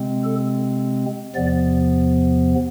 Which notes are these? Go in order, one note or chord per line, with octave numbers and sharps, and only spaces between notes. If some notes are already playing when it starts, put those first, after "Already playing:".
Already playing: C3 G#3 C4
A4
E2 C3 F3 B3 D5